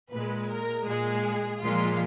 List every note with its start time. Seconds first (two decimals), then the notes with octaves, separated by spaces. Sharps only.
0.11 A#2 G#3 B4
0.50 A#4
0.86 A#2 G#3 G#4
1.61 A#2 F3 G#3 F4